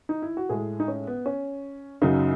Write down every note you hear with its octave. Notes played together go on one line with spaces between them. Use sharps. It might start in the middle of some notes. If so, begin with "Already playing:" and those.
D#4
E4
F#4
A2 G#3 G#4
D#4
C#4
B3
C#4
F#2 C#3 F#3 D#4